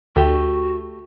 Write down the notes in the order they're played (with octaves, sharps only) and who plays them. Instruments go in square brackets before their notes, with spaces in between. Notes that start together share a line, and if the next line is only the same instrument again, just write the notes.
[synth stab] D2 [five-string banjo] A3 G4 [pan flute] F#4